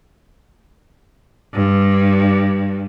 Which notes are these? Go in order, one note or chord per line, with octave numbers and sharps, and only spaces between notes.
G2